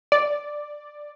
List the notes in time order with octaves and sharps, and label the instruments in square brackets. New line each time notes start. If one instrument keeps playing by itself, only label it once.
[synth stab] D5